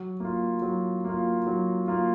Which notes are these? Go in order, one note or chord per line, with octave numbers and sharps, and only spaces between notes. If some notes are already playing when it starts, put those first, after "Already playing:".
Already playing: F#3
A#3 F4
F#3
A#3 F4
F#3
A#3 F4